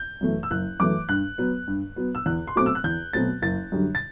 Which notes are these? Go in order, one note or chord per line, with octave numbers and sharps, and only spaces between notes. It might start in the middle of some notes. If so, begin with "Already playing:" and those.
Already playing: G6
F#2 E3 A3
E6
F#1 F#6
F#2 E3 A3 D6
G2 F#6
F#3 B3
G2
F#3 B3
E6
E2 F#6
C6
B2 F#3 A3 C4 D6
E6
F#6
E2 G6
B2 F#3 A3 C4 A6
F#1 A6
F#2 D3 G3
A6